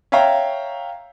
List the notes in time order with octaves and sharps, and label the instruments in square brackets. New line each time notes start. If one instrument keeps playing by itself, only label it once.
[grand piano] C#5 E5 F5 G5 A#5